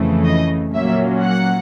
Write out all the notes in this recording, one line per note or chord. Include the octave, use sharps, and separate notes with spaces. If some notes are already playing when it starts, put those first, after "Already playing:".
Already playing: F2 C#3 E3 A3
D#5
A#2 F#3 A#3 C#4 E5
F#5